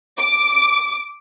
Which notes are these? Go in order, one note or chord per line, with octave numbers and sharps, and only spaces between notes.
D6